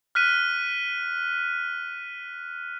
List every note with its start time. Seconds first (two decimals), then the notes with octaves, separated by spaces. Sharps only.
0.15 F6 F#6 B6 D#7